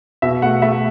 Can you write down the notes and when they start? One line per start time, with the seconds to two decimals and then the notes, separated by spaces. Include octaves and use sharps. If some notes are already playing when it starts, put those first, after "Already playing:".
0.22 B2 E5
0.42 A3 F#5
0.62 A3 E5